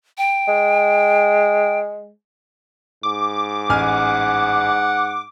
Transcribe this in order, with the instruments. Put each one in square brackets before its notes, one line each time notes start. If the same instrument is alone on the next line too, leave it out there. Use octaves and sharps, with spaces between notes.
[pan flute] G5
[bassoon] G#3
[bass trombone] G#2 [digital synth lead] D6
[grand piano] A1 G#5 F6 [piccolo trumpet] F#5